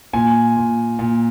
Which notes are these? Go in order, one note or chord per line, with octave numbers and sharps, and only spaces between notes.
A#2 G#5
A#2
A#2